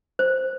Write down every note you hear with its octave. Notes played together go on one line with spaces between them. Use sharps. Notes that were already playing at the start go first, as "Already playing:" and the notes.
C5